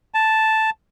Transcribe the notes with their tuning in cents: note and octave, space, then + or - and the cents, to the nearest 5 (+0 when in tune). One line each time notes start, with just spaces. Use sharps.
A5 +0